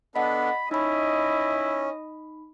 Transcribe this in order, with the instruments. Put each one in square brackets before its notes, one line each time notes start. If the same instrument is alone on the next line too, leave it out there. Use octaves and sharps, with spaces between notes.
[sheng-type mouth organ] B3 D4 A4 [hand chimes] D#5 F#5 [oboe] B5
[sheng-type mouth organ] C#4 [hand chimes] D#4 B5 [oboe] E4 [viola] D#5